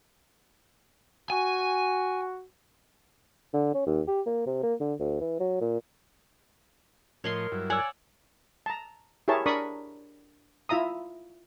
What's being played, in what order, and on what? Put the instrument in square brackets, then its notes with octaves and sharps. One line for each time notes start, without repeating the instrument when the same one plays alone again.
[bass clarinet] F#4 [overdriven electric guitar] G#5
[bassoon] D3
C#4
D#2
G4
A#3
C3
A#3
D3
D2
E3
F#3
A#2
[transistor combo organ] A2 F3 [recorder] A#4 [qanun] C#5 D#5 C6
[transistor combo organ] G2 F#3 E4
[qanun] C#5 D5 F#5 [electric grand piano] G#5 E6
[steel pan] A5 A#5
E4 G4 G#4 A#4 C#5 A5
D4 A#4 D5 B5 C#6 D#6
E4 F4 E5 A#5 D#6